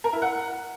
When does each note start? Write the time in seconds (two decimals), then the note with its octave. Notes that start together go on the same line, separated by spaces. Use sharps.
0.04 A#4
0.13 E4
0.22 F#5